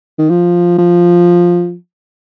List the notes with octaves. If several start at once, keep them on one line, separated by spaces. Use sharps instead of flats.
D#3
F3
F3